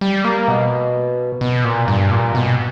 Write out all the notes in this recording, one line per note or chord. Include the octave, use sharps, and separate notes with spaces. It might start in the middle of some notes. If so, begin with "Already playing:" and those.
G3
A#3
B2
B2
A#2
G2
A#2
B2